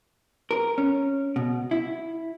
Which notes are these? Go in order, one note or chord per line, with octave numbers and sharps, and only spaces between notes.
A#4
C#4
B2
E4